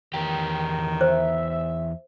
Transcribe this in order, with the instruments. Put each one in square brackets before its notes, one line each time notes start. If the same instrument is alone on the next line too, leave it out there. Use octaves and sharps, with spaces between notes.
[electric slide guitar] E2 G4 G5 [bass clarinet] D#3
[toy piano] C5 [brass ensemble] E5